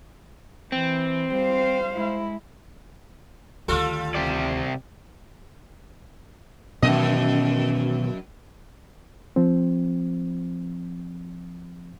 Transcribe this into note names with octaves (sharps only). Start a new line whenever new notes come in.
E3 C4
G3 C5 F5
G#3 E4
D2 D#3 G3 F4 A4
C3 G4 D5
F#2 B2 D#3 E3 D#5
F3 C4